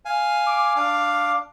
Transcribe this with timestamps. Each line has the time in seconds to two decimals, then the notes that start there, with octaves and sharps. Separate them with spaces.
0.05 F5 G#5
0.46 D6
0.76 D4 F5